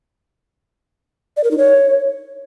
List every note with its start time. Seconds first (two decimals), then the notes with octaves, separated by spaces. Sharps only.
1.37 D5
1.44 A#4
1.51 D#4
1.58 C#5